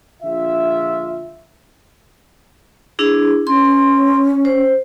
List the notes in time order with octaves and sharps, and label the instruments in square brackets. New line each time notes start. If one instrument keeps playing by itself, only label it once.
[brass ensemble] A#1 D3 F4 E5
[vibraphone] D4 E4 G#4
[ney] C#4 [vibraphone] C6
[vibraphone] C5